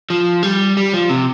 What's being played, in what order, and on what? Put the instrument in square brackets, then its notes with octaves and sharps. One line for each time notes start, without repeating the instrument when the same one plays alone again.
[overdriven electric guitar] F3
G3
G3
F3
C3